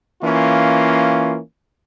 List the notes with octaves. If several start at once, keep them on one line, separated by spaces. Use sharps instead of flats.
E3 A#3 C#4 F4